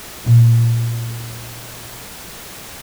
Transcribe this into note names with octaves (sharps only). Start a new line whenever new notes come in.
A#2 F4